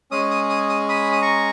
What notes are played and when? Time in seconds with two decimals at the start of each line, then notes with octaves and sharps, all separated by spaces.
0.11 G#3 C#4 G#4 D#6
0.31 D#6
0.50 D#6
0.69 D#6
0.89 B5 D#6
1.13 D#6
1.22 A#5 C#6